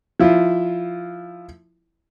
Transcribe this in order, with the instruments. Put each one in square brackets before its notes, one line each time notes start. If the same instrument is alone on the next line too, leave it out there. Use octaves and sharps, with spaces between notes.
[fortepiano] F3 E4 F4